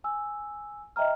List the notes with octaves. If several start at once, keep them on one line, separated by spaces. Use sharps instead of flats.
G#5 E6
D#5 E5 G5 A#5 F6